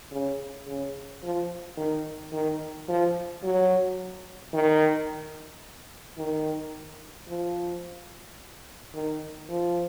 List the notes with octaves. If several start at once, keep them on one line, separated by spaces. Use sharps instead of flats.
C#3
C#3
F3
D#3
D#3
F3
F#3
D#3
D#3
F3
D#3
F3